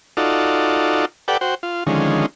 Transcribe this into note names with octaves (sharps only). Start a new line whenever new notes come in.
D#4 F4 F#4 A4 D5
G4 A4 B4 D5 F#5 G5
F#4 C5 G5
F4
D3 D#3 F3 G#3 C#4